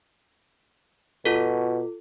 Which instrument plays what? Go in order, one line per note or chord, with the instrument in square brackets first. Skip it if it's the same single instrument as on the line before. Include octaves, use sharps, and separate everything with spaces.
[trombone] B2 [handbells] F4 A4